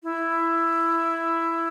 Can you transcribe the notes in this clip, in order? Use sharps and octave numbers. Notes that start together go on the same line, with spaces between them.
E4